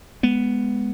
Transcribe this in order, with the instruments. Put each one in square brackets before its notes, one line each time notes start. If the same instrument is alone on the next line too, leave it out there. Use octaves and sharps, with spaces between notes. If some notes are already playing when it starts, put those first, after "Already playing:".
[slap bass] G#3 B3